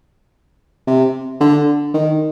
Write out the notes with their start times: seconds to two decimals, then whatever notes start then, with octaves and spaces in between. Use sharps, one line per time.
0.88 C3
1.41 D3
1.94 D#3